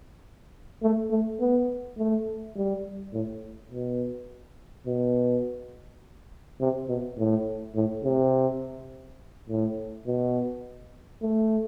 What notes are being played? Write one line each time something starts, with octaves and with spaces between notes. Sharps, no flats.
A3
A3
B3
A3
G3
A2
B2
B2
C3
B2
A2
A2
C3
A2
B2
A3